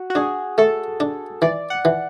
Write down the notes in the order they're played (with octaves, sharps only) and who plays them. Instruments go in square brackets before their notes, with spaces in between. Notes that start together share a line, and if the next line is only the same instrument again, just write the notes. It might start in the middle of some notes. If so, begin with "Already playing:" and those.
Already playing: [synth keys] F#4
F#4
[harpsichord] D4 [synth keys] G#4
[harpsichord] A3 [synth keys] A4
[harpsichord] D4
[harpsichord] E3 [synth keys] D5
[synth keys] F#5
[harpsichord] E3